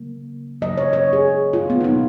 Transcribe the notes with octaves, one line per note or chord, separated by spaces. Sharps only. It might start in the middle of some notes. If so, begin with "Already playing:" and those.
Already playing: C#3 F#3 A#3
C#3 F#3 A#3 D#5
C#5
C#5
G#4
F4
B3
D#4
B2 F#3 A#3 F4